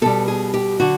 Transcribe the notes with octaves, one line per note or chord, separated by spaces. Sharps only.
B2 G3 A4
G#4
G4
D3 F#3 F#4